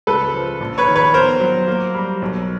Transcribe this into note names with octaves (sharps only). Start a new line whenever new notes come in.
C#2 A4 B4
F3
A#1
B4 C#5
D#3
B4 C#5
B3 A#4 C5
F#3
A#3
G3
B1